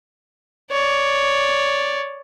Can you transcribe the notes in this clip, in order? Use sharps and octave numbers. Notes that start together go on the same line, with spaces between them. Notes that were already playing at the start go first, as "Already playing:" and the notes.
C#5 D5